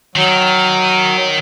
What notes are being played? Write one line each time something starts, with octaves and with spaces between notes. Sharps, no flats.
D#3 F#3